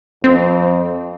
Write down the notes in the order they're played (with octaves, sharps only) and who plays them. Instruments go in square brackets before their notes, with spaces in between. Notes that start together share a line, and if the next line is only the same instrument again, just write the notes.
[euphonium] F2 [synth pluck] C4